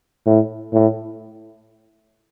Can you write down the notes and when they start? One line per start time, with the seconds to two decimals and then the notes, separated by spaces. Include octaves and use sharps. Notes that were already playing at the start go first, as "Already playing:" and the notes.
0.25 A2
0.72 A2